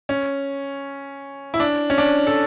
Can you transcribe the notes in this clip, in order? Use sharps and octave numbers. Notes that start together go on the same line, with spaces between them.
C#4
E4
D4
C#4
D4
A4